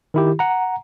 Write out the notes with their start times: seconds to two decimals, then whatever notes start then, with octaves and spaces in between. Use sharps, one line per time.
0.14 D#3 E4 G4
0.39 F#5 A#5